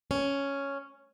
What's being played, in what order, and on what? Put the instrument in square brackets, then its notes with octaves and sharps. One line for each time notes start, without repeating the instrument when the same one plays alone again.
[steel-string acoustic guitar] C#4